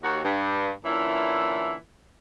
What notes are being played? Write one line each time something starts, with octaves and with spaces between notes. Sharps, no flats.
D#2 F#4
G2
A#2 D3 E3 C#4 E4 E5